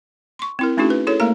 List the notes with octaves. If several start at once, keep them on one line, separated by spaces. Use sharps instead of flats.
C6 C#6
C4 E4 A#4
A3 C#4 D#4 E4 F#4 G#4
B4
E4 G#4 A4 C#5
A3 A#3 A#4 E5 A#5